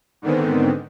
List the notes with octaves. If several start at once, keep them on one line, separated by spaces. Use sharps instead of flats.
G#2 D3 D#3 B3 C4